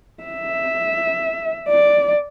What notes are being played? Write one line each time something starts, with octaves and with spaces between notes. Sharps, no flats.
E5
D5